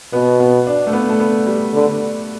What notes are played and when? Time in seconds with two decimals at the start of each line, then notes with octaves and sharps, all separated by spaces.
0.12 B2 B3
0.40 B3
0.67 D4
0.87 A3
0.93 B3
1.09 A3
1.20 B3
1.46 G3
1.74 D3